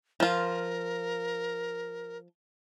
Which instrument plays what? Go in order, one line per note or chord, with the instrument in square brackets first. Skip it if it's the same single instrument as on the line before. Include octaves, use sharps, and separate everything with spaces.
[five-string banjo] F3 F4 [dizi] A#4